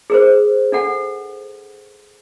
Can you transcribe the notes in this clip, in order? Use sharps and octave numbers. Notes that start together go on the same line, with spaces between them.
G#4 A#4 C5
D4 A4 F#5